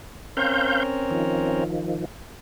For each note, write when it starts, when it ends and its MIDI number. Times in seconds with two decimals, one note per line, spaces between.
0.37 1.64 60
0.37 1.64 61
0.37 1.64 70
0.37 0.83 72
0.37 0.83 77
0.37 0.83 91
1.11 2.05 51
1.11 2.05 53